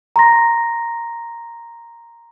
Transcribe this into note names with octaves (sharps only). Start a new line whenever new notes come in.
A#5 C6 A#6